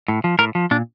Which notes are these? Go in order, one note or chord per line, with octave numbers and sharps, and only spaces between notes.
A2
F3
A2 A#4
F3
A#2 D4